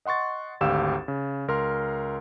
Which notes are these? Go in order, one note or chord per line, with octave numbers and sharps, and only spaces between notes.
D#5 F#5 C6 C#6 A6
G#1 D2 G4 F5 E6 E7
C#3
C#2 A#4 C6 F6